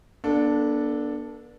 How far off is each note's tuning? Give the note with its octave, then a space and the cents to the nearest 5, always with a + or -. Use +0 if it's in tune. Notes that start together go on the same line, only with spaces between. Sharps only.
B3 -45 D4 +0 A4 +0